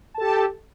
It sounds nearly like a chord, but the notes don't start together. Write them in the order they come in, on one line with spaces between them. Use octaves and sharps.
A5 A4 G4